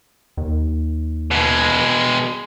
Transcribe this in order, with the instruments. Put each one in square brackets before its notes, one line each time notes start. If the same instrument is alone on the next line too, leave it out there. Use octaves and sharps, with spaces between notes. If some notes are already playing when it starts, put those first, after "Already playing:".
[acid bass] D#2
[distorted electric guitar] B2 G#3